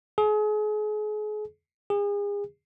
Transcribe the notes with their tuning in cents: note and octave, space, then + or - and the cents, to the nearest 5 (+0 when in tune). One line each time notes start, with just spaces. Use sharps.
G#4 +35
G#4 -35